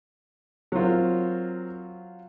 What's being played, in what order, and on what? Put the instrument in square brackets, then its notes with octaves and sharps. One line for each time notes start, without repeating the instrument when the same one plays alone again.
[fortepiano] F#3 F4 [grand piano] C4 A#4